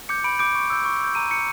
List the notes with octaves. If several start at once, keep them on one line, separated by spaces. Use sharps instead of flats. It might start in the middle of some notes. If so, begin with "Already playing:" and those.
D6 G6 C#7
B5 D7
D6 G6 D7
C#6
E6 G6
C#6
E6 G6
A#5 D#7
D6 G6 C#7